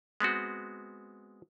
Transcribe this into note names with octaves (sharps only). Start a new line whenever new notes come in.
G#3 B3 C4 F#4